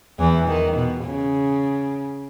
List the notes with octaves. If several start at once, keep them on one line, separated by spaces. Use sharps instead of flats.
E2 E3
D#3
B2
C#3